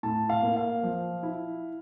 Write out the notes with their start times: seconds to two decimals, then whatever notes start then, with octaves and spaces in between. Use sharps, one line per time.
0.03 A2 A5
0.30 F5
0.43 A#3
0.56 F5
0.83 F3
1.23 E4